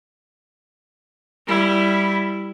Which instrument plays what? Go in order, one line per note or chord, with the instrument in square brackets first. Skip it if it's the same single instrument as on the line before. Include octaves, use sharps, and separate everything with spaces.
[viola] G3 E4